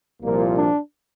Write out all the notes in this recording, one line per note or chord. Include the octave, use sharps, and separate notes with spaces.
C2 A#2 F3 A#3
D4